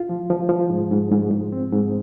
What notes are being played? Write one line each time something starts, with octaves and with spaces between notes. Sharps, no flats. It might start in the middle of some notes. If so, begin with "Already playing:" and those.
Already playing: F4
F3
F3
F3
G#2
G#2
G#2
G#2
C4
G#2